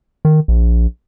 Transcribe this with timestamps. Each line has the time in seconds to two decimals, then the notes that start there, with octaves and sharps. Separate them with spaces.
0.25 D#3
0.48 A#1